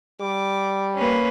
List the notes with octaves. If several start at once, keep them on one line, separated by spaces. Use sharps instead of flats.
G3 D6
A#3 C#4 B4